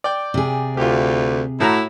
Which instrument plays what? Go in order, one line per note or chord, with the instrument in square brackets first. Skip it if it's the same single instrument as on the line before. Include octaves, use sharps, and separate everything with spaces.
[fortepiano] D5 G5
[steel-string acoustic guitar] C3 G#4
[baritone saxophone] D2 [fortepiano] F4 G4
[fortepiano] A2 F#4 A#5 [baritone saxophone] E4